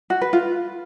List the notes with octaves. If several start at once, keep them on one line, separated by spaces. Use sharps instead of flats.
F#4
B4
F4